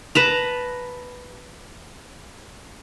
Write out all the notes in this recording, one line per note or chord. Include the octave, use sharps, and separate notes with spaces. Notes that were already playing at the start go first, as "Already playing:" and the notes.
B4 A5 A#5